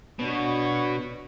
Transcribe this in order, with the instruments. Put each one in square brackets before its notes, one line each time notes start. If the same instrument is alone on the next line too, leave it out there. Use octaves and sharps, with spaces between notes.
[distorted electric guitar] B2 [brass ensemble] D4 F#4 C#5